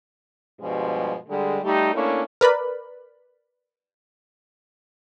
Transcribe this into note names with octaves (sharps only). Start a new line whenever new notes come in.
G2 B2 F3 G3 G#3
D3 G3 G#3
G3 A3 D#4 G4
A3 A#3 C#4 D4 E4
A#4 B4 D5 B5